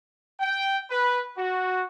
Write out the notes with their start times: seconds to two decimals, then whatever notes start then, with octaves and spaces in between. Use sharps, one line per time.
0.40 G5
0.90 B4
1.37 F#4